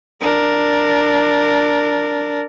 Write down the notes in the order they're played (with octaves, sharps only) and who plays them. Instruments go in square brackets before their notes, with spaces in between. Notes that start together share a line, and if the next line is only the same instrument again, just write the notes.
[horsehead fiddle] D4 A#4